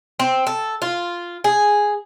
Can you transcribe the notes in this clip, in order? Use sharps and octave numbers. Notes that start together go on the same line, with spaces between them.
C4
A4
F4
G#4